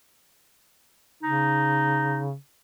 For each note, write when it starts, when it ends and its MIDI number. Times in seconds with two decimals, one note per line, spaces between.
1.23 2.34 49
1.23 2.27 63